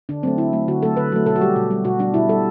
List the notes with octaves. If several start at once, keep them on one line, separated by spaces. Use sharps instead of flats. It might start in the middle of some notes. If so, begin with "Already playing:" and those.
D3 D4
F#3 A3 C4
D3 E4
F#3 A3
D3 F#4
F#3 A3 A4
D3 B4
F#3 A3
B2 A4
F#4
G3 G4
B2
G3
B2 F#4
G3 D4
B2 E4
G3 A4